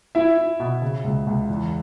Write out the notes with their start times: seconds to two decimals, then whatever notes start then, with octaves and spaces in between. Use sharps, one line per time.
0.15 E4 E5
0.38 E4
0.60 B2
0.82 C#3
1.04 C#2
1.27 C#2
1.48 E2